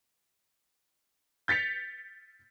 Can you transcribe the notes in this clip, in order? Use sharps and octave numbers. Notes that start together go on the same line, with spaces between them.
G6 A6 B6 C#7 F7